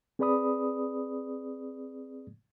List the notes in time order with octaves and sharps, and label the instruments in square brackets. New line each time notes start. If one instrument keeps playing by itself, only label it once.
[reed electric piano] C4 G#4 B4 D5 B5 D#6